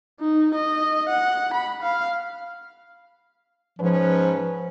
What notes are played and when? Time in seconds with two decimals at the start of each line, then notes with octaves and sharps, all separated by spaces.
0.20 D#4
0.54 D#5
1.09 F#5
1.54 B5
1.83 F5
3.79 G#2 F3 C#4 B4